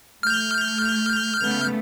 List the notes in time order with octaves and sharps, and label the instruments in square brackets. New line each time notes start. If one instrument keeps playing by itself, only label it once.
[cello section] A3 [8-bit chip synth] F6 G6
[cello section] C#3 A3 B3